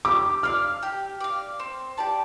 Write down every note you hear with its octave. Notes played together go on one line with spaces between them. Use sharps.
G4 D6
D5 F5 F6
G4
D5 F5
C4
G4 D5 A5